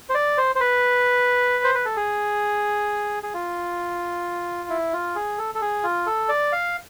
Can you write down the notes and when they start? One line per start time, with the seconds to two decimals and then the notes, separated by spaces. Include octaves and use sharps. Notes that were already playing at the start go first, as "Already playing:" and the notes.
0.09 C5
0.15 D5
0.38 C5
0.55 C5
0.61 B4
1.64 C5
1.75 B4
1.85 A4
1.97 G#4
3.23 G#4
3.34 F4
4.69 E4
4.93 F4
5.15 G#4
5.38 A4
5.55 A4
5.62 G#4
5.83 F4
6.06 A4
6.29 D5
6.52 F5